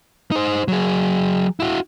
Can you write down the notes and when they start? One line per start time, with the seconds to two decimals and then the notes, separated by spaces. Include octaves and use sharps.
0.31 D#4 C5
0.68 F#3 G#4
1.60 E4 F#4